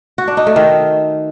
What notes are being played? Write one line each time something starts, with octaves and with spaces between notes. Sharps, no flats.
F#4
D4
D#4
A3
D#3